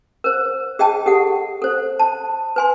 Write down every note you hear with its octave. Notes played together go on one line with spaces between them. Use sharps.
A#4 C5
G#4 D#5 G5 A5
G4 A4 F#5
A4 C5
A5
B4 G#5 C6